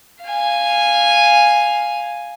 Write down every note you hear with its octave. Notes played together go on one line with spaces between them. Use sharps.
F5 G#5